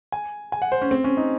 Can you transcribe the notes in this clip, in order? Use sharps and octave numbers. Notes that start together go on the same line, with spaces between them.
G#5
G#5
F#5
C5
C#4
C4
C#4
D#4